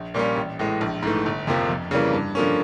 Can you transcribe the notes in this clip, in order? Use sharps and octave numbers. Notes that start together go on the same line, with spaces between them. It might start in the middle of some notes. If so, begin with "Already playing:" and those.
Already playing: A#1
A#2 G3 A#3 C#4
A1
A2 E3 G#3
A#1
G#2 E3 A3
G1
F2 C3 F3 A#3
F2
C#3 E3 G3 A#3
G2
D3 F3 A#3 C#4